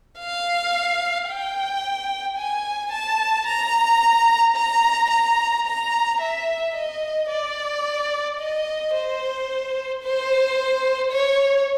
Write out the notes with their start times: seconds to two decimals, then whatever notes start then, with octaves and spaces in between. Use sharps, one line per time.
0.20 F5
1.29 G5
2.38 G#5
2.92 A5
3.47 A#5
4.57 A#5
5.10 A#5
5.66 A#5
6.21 E5
6.75 D#5
7.30 D5
8.39 D#5
8.94 C5
10.03 C5
11.12 C#5